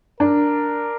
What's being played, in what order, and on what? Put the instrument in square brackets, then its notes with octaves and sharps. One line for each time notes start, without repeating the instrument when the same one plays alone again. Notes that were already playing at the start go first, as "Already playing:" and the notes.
[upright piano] D4 [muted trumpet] A#4